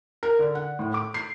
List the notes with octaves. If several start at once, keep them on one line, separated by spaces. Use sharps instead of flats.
A#4
D3
F#5
A2
D6
C7